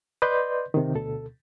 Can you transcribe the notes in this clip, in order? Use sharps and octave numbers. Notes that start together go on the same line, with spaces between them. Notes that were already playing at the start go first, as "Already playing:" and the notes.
B4 D5 D#5 C6 G6
C3 D#3
D2 B2 A4